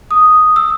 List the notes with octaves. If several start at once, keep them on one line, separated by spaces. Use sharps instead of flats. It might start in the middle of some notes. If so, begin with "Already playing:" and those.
D#6
E6